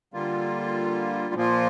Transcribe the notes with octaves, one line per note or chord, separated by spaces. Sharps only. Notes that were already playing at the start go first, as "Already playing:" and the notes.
D3 G3 A#3 F4
A#2 F3 A#3 F4